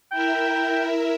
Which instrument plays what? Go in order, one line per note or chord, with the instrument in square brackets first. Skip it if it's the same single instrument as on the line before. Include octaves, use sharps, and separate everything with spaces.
[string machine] E4 A#4 E5 [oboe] G5